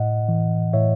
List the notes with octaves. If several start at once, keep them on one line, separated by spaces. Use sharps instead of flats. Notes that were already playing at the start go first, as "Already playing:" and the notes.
Already playing: A2 D#5 F#5
E3
A2 C#5 E5